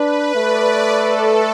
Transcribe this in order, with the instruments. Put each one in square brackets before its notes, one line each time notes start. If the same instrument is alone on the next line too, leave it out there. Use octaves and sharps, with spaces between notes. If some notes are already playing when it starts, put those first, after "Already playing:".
Already playing: [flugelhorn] D4 [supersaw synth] B4
[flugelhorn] A3 [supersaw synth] D5
[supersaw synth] A4